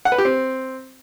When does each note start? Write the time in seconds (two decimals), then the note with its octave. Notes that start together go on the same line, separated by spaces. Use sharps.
0.05 F#5
0.12 B4
0.18 G4
0.25 C4